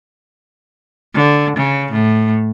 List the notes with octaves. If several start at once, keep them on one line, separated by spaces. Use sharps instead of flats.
D3
C#3
A2